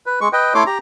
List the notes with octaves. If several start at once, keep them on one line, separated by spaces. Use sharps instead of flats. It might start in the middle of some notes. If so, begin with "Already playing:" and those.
B4
G#3 C#6
B4 D#5 G5
A3 E4 A4 C#5 C6 D6
G4 A#5